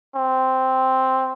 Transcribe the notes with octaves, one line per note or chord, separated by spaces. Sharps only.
C4